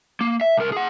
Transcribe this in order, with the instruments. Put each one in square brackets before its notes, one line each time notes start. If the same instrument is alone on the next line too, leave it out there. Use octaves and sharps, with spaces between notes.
[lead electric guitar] A#3
E5
C2 A#4
G#4 F#5